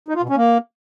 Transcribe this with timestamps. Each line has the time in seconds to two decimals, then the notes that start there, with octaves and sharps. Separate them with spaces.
0.08 D#4
0.15 F4
0.22 B2
0.29 C#4
0.36 A#3